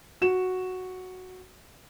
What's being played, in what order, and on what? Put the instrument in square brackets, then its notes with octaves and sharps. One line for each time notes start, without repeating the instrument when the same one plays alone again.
[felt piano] F#4 E7